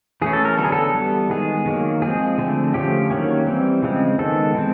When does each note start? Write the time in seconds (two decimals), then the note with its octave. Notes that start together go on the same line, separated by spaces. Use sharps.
0.22 E3 A3 C#4 G#4
0.33 A4
0.45 A#4
0.58 D3 F#3 B3 A4
0.65 G#4
0.72 A4
0.94 E3 G3 B3
1.30 D#3 G#3 B3 G#4
1.66 D#3 F#3 A#3
2.02 F3 G#3 C4 G#4
2.38 D3 F3 A3 C4
2.74 D3 F3 A3 C#4 G4
3.10 D#3 F#3 A#3 C#4
3.46 E3 G3 C4
3.82 C#3 F3 G#3 C4
4.19 D#3 G#3 B3 A4
4.55 E3 G#3 C4